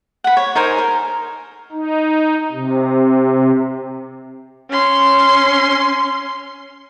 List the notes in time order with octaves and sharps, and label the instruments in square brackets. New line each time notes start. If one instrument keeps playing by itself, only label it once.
[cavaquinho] F#5 B5
C#5
D#4 A#4 C5 G#5
A#4
[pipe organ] D#4
C3
[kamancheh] C#4 C6